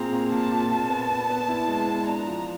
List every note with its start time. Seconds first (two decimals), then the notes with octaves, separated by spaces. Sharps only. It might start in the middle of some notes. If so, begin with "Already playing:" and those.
Already playing: A#2 C4 G#4 A#5
0.13 A#2
0.32 A#2 A5
0.52 A#2
0.71 A#2
0.90 B3
1.10 B3
1.30 B3
1.48 E4
1.68 G#3
1.88 B3
2.07 D4 A#5
2.27 F3